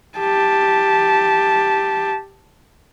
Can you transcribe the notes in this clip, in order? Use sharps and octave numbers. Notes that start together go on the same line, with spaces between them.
G4 A5